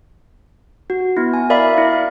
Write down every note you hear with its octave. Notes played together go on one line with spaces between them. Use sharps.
F#4
B3 E4
G#5
A#4 D5 E5 F5 B5
E4